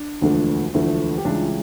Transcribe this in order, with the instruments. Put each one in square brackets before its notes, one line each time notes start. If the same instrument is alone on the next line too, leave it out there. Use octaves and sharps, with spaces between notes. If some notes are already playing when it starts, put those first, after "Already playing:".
Already playing: [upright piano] D4
E1 D2 D3 F3 A3
E1 D2 D3 F3 A3 E4
G4
C#2 C#3 E3 G3 D4 F4